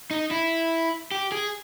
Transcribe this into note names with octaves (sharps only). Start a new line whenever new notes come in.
D#4
E4
G4
G#4